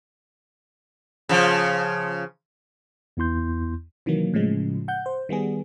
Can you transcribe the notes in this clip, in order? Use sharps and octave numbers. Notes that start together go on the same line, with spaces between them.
C#3 F3
E2 B3 E4 C6 G6
C3 D#3 E3 F#3 A#3
A2 C#3 F3 G#3
F#5 G6
C5
D#3 G3 B3 G#4